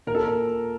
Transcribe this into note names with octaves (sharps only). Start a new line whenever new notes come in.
A#2 A#4
A4
A#2 A#4